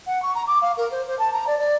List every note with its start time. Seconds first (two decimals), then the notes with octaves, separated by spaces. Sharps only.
0.06 F#5
0.22 C#6
0.35 A#5
0.47 D6
0.62 F5
0.77 A#4
0.91 C5
1.07 C5
1.19 A5
1.33 A#5
1.47 D5
1.59 D5